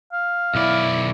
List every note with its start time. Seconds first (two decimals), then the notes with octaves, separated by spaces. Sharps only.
0.13 F5
0.55 B1 E4 D5